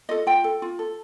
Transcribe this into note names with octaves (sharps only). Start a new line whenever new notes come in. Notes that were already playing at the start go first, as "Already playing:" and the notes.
F4 A4 D#5
F4 G5
A4
F4
A4